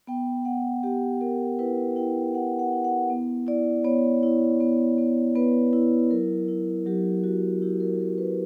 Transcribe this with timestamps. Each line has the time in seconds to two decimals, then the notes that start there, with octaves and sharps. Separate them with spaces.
0.07 B3 G5
0.45 B3 F#5
0.83 B3 G4
1.21 B3 A#4
1.59 E4 B4
1.96 E4 G5
2.34 E4 F#5
2.59 F#5
2.72 E4
2.84 F#5
3.10 B3
3.47 E4 D5
3.84 B3 C#5
4.23 E4
4.60 B3
4.98 B3
5.35 B3 B4
5.73 E4
6.11 F#3 A#4
6.48 E4
6.86 F#3 G4
7.24 F#3 F#4
7.62 E4 G4
7.80 A#4
8.00 F#3 A#4
8.18 B4